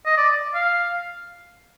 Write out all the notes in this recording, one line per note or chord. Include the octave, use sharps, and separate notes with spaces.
D#5
D5
F5